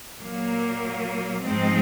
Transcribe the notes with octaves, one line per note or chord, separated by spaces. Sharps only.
A#2 F#3 A#3
G#2 F3 G#3 C4 D#4